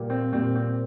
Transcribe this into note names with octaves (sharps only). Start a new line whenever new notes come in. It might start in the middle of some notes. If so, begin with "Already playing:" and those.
Already playing: A#2 G3 A#3
C4
A#2 G3 A#3 C4
C4